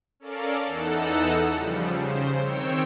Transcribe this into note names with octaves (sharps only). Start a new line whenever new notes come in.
C#4 A4 A#4 D5 F5
E2 E3 D#4 A4 F#5 E6
C#3 F3 G3
C#3 C5
D#3 C4 C#5 G5 E6 C#7